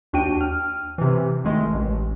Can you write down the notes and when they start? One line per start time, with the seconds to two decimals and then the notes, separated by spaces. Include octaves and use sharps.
0.13 D#2 D4 F#4 G5 D#7
0.41 F6
0.98 C3 E3
1.44 G#1 D#3 G#3 A3
1.73 A1